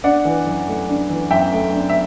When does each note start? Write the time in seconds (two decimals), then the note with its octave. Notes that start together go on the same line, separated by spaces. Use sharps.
0.04 D4 D5 F#5
0.25 E3
0.47 F#2
0.68 A3
0.89 D4
1.10 E3
1.31 F#2 E5 G5
1.52 A3
1.73 D4
1.89 E5